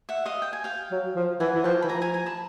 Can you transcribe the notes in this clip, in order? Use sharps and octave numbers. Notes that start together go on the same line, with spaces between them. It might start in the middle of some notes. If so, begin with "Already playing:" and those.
E5 F#5
D#5 F5
G5
G#5
F5 G5
F#3
F3
E3 F#5 G#5
E3
F3 G5 A5
E3 B5
F3 G#5 A#5
G#5 A#5
G#5 A#5
A5 B5